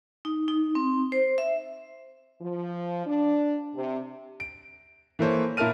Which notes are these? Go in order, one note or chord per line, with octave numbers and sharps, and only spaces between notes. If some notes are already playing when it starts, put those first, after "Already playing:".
D#4
D#4
C4
C5
E5
F3
D4
C3
D7
E3 A#3 A4 C5 C#5
A#2 E4 A#4 A5 F6 D#7